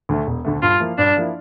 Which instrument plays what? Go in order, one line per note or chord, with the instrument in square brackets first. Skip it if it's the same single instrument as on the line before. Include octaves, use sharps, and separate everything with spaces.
[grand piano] D2 D3 A3
E1
D2 D3 A3
[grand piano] G2 [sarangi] F4
[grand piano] F3 A#3 E4
[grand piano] G2 [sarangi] D4
[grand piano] F3 A#3 E4